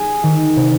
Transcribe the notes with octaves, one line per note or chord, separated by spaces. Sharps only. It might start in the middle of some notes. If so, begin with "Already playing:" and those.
Already playing: G#4
D#3
C3